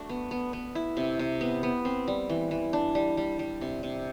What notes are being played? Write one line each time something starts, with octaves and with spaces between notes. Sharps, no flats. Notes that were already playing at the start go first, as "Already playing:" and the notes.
Already playing: A3 D4 F#4
B3
B3
B3
E4
C3
C3
B3
B3
C4
G3
E3
E3
D4
G3
G3
G3
C3
C3